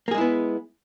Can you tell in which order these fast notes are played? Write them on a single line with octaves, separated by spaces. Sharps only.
A#3 G#4 G#3 E4 B3